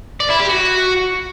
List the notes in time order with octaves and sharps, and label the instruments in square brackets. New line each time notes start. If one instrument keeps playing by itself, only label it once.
[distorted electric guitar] D5
E4
G4
F#4